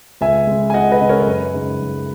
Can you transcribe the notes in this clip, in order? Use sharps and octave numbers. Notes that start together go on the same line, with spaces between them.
C#2 E5 G#5
C#3 G#3
G#5
C#2 D#5 F#5
B4 D#5
C#3 G#3
A#4 C#5
C#5
F#2 B4
C#3 G#3 D#4
F#2